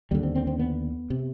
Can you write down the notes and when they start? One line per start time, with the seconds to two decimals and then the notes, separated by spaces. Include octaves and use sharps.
0.11 D#2 D3 G3
0.23 C4
0.36 C4
0.47 C4
0.59 B3
1.10 C3